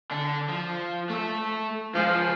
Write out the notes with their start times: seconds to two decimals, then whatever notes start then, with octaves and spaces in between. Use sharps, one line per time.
0.11 D3 D4
0.48 F3
1.10 A3 E5
1.95 C#2 F3 G#3